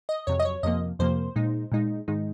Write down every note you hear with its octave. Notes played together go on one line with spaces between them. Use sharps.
D#5
F2 C3 F#3 C#5
D#5
C#5
F2 C3 F3 A#3 D#5
F2 C3 F3 A#3 C5
A#2 G#3 D#4
A#2 G#3 D#4
G#2 D#3 G#3 D#4